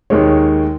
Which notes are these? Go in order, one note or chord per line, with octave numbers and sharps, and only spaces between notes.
D#2 D#3 G#3 C#5